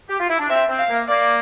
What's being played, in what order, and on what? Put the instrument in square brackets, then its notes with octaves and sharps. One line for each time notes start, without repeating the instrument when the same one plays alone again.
[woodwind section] G4
F4
E4
D4
[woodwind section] C4 [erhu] E5
[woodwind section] C4
[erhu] F5
[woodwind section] A#3
[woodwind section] A#3 [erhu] D5